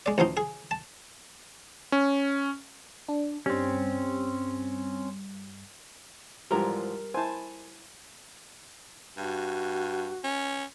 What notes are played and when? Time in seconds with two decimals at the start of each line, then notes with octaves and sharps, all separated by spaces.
0.06 G#3 D5
0.18 A1 D2 F3 D#4
0.37 G#4
0.71 A5
1.92 C#4
3.09 D4
3.46 G2 G3 C4 C#4
6.51 G#2 E3 F3 G3 G4 A#4 A#5
7.14 E4 C5 G#5 A5
9.18 G2 F#4
10.24 C#4